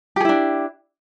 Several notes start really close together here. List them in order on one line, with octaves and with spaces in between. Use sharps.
G4 G#4 E4 D4